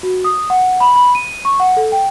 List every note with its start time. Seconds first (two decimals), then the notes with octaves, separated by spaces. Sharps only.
0.03 F#4
0.24 D#6
0.50 F#5
0.80 B5
0.96 B5
1.15 D#7
1.45 C#6
1.60 F#5
1.77 A4
1.92 G5